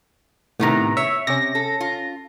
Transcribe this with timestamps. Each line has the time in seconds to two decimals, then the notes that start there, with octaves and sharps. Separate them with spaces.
0.60 A2 C3 D#3 B3 A#5
0.97 C#5 E5
1.27 C3 C#4 A#6
1.55 A4
1.81 F4